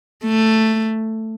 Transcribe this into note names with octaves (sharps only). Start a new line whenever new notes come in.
A3